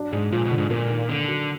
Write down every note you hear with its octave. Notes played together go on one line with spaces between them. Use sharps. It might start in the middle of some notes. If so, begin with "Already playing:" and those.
Already playing: F#3 D4
G#2 G#3
A#2 F3
B2
D3
G#2
A#2 A#3
D#3
D3 A#3
F#3